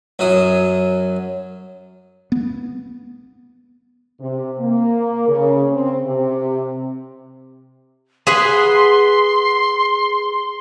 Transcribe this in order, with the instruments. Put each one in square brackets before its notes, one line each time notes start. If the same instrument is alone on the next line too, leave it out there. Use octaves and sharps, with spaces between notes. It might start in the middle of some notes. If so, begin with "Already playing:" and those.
[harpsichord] F#2 F#3 D#6
[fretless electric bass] B3
[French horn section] C3
A#3
C#3
C4
C3
[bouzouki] G#4 B4 F#5 [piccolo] C6